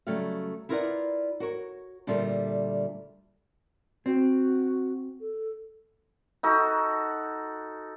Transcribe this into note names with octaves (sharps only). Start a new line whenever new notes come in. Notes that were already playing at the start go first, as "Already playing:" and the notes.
C#3 F#3 G3 A3 F5
E4 F4 A#4 B4 D5 F#5
F#4 A#4 C#5
D2 A#2 G3 A3 F4
C4 F#4
A4
D#4 F#4 A4